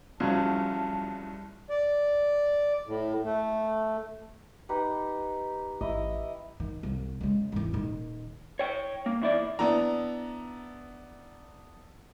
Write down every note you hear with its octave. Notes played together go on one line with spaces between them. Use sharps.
C2 C#3 F3 F#3 A5
D5
A2
A3
D#4 G4 B4
A1 E4 D#5
D#3
C2
C#3 G#3
G#1 E2
D#1 D#3
C#5 G5
A#3
E2 E4 D5
B3 D4 E4 A#5